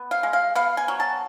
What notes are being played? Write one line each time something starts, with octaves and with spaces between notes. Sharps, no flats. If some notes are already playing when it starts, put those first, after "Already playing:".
Already playing: B3
F5
G#3
F5
B3 F5
G#5
F#3
A5